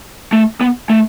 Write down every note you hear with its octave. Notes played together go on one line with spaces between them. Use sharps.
A3
B3
A3